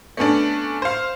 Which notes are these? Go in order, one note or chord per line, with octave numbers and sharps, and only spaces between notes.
A3 B3 C#4 D4
C5 F5